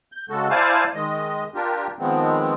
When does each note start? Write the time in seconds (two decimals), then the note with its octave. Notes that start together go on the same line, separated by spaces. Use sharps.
0.12 G6
0.30 C#3 G#3 F#4 A4
0.50 E4 C5 D5 F5 G#5 A5
0.94 D#3 G#3 D#5
1.55 D4 F4 G4 A#4
1.99 D#3 F3 G#3 B3 C4